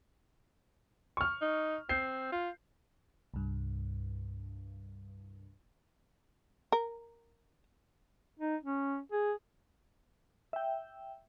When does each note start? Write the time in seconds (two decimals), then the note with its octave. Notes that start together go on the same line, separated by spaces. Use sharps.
1.17 C#6 F6
1.41 D#4
1.89 C4 G6 C7
2.32 F4
3.34 C2 G2
6.72 A#4
8.39 D#4
8.63 C#4
9.12 G#4
10.53 E5 G5